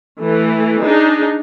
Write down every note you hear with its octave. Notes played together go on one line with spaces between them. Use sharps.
E3 A3
D4 D#4 G#4